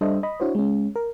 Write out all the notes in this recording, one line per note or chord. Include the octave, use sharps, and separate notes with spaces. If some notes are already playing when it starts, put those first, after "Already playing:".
G3 D4 A4 C5 D#5 E5
D#5 B5
D4 E4 F#4 C5 C#5
G#3 C#4
A#4